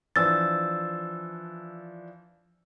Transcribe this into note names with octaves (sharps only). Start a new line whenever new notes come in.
E3 F3 D4 E6 A6